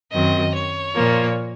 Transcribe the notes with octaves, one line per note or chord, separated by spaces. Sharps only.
F#2 D#3 F#3 C4 D#5
C#5
A#2 F3 A#3